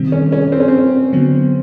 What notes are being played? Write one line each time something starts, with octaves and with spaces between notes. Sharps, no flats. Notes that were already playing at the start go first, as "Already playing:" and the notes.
Already playing: C3 D#3 G3 C4
C#4
C#4
C4
C#4
C4
D3 F#3 B3